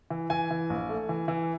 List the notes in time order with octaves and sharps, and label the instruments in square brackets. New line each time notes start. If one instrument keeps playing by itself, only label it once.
[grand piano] E3
E3 G#5
E3
A#1
A3
E3
E3